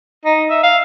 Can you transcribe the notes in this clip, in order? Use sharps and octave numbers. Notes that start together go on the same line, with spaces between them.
D#4
E5
F5